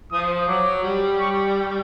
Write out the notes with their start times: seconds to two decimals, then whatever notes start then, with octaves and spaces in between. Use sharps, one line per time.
0.12 F3 D#6
0.48 F#3 D6
0.83 G3
1.19 C#6